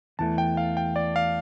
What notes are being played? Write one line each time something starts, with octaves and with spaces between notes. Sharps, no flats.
E2 E3 A3 A5
G5
F5
G5
D5
F5